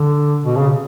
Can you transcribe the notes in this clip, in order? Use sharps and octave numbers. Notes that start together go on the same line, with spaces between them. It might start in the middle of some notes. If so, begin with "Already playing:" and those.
Already playing: D3
B2
C#3